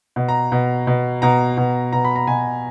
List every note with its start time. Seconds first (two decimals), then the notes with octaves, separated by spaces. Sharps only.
0.16 B2
0.29 A#5
0.52 B2
0.87 B2
1.22 B2 A#5
1.57 B2
1.92 B2 A#5
2.05 B5
2.16 A#5
2.27 B2 G#5